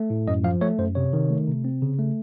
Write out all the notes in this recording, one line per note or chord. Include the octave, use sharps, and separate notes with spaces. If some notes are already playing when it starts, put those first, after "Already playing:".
Already playing: A3
A2
F#2 D#5
F3 F5
A3 C#5
F#2 C5
C3 C#5
D#3
A3
C3
C4
C#3
A3